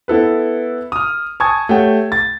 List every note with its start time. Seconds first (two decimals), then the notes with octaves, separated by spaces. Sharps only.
0.08 B3 E4 A4 B4
0.92 D#6 F6
1.40 G#5 A5 C#6 D#6 G#6
1.69 A3 G4 C#5 F#5 G5
2.12 A6